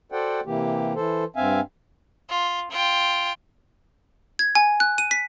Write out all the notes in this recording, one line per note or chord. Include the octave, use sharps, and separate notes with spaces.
F#4 A4 C5 D5 F#5 G5
C3 E3 A#3 G4
E3 A4 C5
G2 C4 E5 F5 G#5
F4
F4 G5
G#6
G#5
F#6
D#7
B6